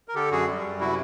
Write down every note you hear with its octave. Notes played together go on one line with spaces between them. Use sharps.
A#4
D3 G4 A4
F#2 F#4 G#4
G3
F#2
C3 E4 F#4